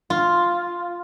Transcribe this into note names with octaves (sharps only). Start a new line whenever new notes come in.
F4